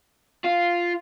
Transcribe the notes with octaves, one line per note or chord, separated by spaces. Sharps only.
F4